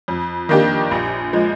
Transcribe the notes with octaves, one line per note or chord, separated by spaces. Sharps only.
F2
D#3 A#3 D4 G4
A#1
F3 G#3